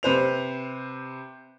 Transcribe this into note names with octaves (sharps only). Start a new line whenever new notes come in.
C3 B4 C5 F7